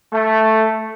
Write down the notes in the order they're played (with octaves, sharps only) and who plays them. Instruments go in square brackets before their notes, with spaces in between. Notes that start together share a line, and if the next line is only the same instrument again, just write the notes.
[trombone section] A3